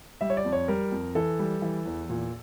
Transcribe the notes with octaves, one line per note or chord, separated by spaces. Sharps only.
G3 E5
C#5
D5
F2
C#5
G3 A#4
F2
E3 A4
G3
E3
E2
A#2